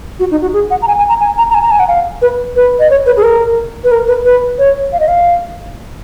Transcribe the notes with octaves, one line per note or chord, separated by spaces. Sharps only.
F#4
D#4
F#4
G#4
F#5
A#5
G#5
G#5
A#5
G#5
A#5
A#5
G#5
A#5
G#5
F#5
F5
B4
B4
D#5
C#5
B4
G#4
A#4
B4
A#4
B4
B4
C#5
F5
D#5
F5